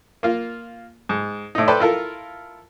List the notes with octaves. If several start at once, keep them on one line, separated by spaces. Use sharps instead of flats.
A#3 F4
G#2
A2 D#4
A4 B4 C5 D5 G5
E4 F4 A4 A#4